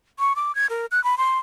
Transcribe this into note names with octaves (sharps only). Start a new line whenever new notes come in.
C#6
D6
G#6
A#4
F#6
B5
C6